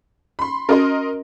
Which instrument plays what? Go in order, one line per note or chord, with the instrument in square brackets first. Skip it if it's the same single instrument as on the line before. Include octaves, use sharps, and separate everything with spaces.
[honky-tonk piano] B5 C6
[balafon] C#4 F#4 [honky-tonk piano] A#4 D#5 C6